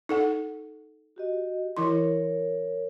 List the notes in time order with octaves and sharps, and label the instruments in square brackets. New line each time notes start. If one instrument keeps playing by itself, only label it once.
[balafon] D#4 A4 F#5
[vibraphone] F#4 G4 D#5
[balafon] E3 E4 C6 [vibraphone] A#4 C#5